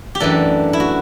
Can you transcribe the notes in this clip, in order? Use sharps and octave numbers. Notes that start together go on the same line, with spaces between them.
G4
F#2 E3 A3 D4 A4
E4
F#4